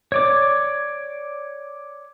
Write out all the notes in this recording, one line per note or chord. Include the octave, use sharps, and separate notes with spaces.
C#5 D5 D6